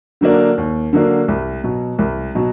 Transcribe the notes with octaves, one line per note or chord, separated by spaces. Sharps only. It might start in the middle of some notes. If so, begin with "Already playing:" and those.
D3 F#3 A#3 D4
D#2
D3 F#3 A#3 D4
C2
B2 F#3
C2
B2 F#3